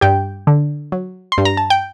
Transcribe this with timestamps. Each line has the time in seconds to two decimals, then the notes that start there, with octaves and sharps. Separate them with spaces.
0.01 G2 G4 G5
0.47 D3
0.92 F#3
1.32 C6
1.38 G2
1.45 A#5
1.57 A5
1.70 G5